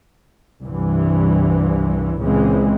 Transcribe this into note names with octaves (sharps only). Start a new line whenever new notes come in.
C2 G2 E3
C#2 A#2 C#3 E3 G#3 C4